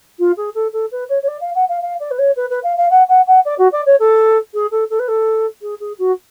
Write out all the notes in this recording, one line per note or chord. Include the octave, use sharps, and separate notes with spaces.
F4
G#4
A4
A4
B4
C#5
C#5
D5
F5
F#5
F5
F5
D5
B4
C#5
B4
B4
F5
F5
F#5
F#5
F#5
D5
F#4
D5
C#5
A4
G#4
A4
A4
B4
A4
G#4
G#4
F#4